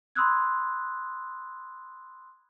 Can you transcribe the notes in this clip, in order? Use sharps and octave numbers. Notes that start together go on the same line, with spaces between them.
B5 C6 D#6 E6 F#6 G#6